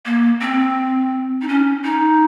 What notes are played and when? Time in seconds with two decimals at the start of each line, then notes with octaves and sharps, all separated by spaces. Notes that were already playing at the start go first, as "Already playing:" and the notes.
0.05 A#3
0.41 C4
1.42 D#4
1.48 C#4
1.84 D#4